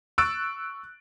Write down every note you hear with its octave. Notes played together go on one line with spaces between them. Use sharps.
C#6 E6 F#6 A6 D7